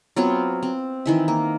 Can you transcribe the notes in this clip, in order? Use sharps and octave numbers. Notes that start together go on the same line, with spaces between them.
F#3 B3 C4 F4
C4
D#3 E3 E5
A#3